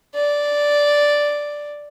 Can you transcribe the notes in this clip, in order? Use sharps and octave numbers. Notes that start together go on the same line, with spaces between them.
D5